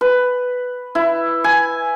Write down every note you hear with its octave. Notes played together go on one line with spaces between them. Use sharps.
B4
E4
G#5